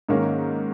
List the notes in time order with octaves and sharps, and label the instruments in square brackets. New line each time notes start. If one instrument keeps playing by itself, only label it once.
[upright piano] G#2 D#3 A#3 C#4